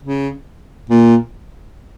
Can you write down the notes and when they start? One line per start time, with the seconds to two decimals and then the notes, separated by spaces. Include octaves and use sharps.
0.03 C#3
0.89 A#2